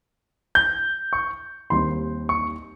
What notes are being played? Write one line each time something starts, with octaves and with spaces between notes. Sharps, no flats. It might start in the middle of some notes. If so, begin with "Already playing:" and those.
G6
C#6
D#2 D#3 G3 C4 D#4 C6
C#6